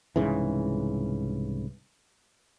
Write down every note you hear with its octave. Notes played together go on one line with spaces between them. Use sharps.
C2 G#2 C#3 E3